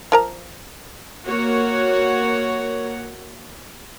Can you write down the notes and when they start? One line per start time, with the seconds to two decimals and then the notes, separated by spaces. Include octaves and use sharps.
0.12 F3 A#4 A#5
1.26 A#3 F#4 C#5 F#5